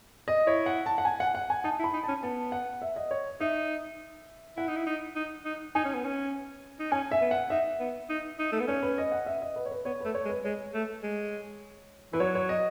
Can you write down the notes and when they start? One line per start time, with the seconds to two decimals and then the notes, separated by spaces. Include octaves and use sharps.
0.28 D#5
0.46 E4 C#5
0.66 F#5
0.86 A5
0.98 F#5
1.05 G#5
1.20 F#5
1.35 F#5
1.50 G#5
1.64 D#4 A5
1.79 E4
1.84 B5
1.94 D#4
2.03 C#4 A5
2.23 B3 A5
2.52 F#5
2.82 E5
2.96 D#5
3.11 C#5
3.40 D#4 E5
4.57 E4 F#5
4.68 D#4
4.77 E4
4.87 D#4
5.16 D#4
5.45 D#4
5.75 D#4 G#5
5.85 C#4
5.94 B3
6.05 C#4
6.80 D#4
6.92 C#4 G#5
7.11 E5
7.21 B3
7.31 F#5
7.50 D#4 E5
7.80 B3
8.10 D#4
8.39 D#4
8.52 A3
8.60 B3
8.68 C#4 C#5
8.83 B4
8.98 D#5
9.12 F#5
9.26 E5
9.42 D#5
9.56 B4
9.66 C#5
9.71 B4
9.85 B3 C#5
10.01 A3 B4
10.15 C#5
10.25 G#3
10.29 B4
10.44 G#3 C#5
10.74 A3
11.03 G#3
12.13 E3 B4
12.20 F#3 C#5
12.35 C#5
12.49 D#5